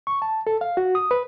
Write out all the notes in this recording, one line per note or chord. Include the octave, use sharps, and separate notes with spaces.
C#6
A5
A4
F5
F#4
D#6
B4